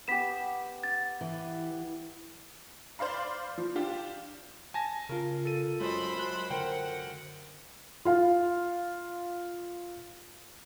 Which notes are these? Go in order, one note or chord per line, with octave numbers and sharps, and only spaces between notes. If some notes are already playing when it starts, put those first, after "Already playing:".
B3 G4 B6 E7
A6
E3
C5 D5 F5 B5
F3
D4 F4 G4
G#5 A5 A#6
C#3 F4 A#4
A4 D#7
F#2 G#3 C5 D#5 B5
F#2 F#6
D3 A#4 C5 F#5 G5
F4 F5